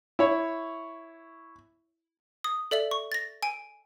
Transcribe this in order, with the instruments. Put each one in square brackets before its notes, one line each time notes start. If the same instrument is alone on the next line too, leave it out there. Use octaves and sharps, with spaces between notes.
[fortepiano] E4 C#5
[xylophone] D#6
A4 D5 E5 F#7
C#6
A6 A#6
G#5 D7 D#7